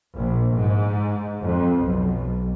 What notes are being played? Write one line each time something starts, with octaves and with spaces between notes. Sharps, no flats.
A#1
G#2
F2
B1